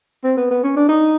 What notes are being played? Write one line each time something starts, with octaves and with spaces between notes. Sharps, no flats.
C4
B3
B3
C#4
D4
D#4